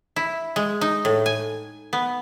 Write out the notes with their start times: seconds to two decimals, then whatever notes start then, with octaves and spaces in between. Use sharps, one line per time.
0.16 E4
0.56 G#3
0.81 D#4
1.05 A2
1.26 G#5
1.93 B3